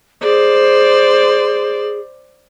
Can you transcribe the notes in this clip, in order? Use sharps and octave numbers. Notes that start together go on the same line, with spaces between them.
G#4 C5 D5